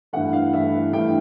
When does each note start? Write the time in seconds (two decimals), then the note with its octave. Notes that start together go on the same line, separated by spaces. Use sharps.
0.13 G2 E3 A3 F#5
0.33 F5
0.53 G2 E3 A3 E5
0.93 G2 E3 A3 G5